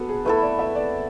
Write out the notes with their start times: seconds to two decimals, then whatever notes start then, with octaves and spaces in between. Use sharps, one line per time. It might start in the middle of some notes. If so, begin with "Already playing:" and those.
Already playing: B3 F#4 A4 B4
0.09 G#4
0.25 A3 E4 A4 B4
0.42 D5
0.59 E5
0.75 D5